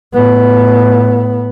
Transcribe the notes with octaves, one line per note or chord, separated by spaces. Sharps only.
A2 B3